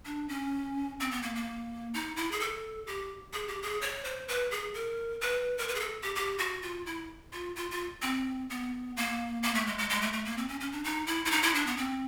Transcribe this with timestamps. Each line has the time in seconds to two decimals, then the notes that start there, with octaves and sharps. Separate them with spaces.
0.05 D4
0.29 C#4
1.00 C4
1.11 B3
1.22 A#3
1.35 A#3
1.94 D#4
2.16 E4
2.31 G#4
2.40 A4
2.87 G4
3.33 G#4
3.48 G4
3.62 G#4
3.81 C#5
4.04 C5
4.28 B4
4.51 G#4
4.74 A#4
5.21 B4
5.58 A#4
5.68 B4
5.75 G#4
5.80 A4
6.03 G4
6.15 G4
6.38 F#4
6.62 F4
6.86 E4
7.33 F4
7.56 F4
7.71 F4
8.02 C4
8.50 B3
8.97 A#3
9.43 A#3
9.55 A3
9.67 G#3
9.78 G#3
9.90 G#3
10.01 A3
10.13 A3
10.25 A#3
10.38 C4
10.48 C#4
10.60 C#4
10.72 D4
10.84 D#4
11.07 E4
11.25 E4
11.31 D#4
11.42 E4
11.54 D4
11.66 B3
11.77 C4